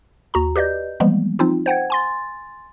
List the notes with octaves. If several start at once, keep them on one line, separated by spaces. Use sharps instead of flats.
D#2 F#4 A#5
G4 B4 D5 D#5 G6
E3 F3 G3 G#3 A#3 B3
F3 C4 D#4 F4
C5 F#5 G5 G#6
G#5 C6 A6